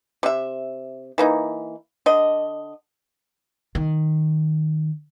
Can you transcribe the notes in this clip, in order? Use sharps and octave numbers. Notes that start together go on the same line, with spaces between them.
C3 E5
E3 A#3 D#4
D3 D#5
D#3